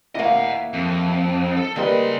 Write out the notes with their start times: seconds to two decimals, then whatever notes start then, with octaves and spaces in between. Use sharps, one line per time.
0.15 D#2 A#3 E4 D#5 F#5
0.73 F2
1.57 A4
1.76 C#3 G3 A#3 D#4 G4 B4 C6